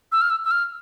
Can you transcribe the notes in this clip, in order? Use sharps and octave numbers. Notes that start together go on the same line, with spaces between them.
E6
F6
E6
E6
F6